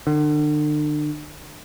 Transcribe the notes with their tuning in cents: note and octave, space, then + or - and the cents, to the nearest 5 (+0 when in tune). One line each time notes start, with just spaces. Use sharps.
D3 +40